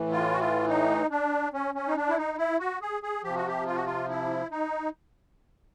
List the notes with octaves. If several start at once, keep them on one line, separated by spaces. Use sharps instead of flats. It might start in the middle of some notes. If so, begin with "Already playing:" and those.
Already playing: A2 E3
F4
F#4
F4
D#4
D4
C#4
C#4
D#4
D4
E4
D#4
E4
F#4
G#4
G#4
C3 F3 G4
F#4
G4
F4
F#4
F4
E4
D#4